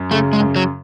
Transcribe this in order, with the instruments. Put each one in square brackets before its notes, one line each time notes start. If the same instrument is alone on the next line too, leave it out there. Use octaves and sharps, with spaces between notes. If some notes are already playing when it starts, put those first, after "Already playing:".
Already playing: [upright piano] F#2
[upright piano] C#3 [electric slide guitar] A3
[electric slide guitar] G#3
[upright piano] F#2
[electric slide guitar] F#3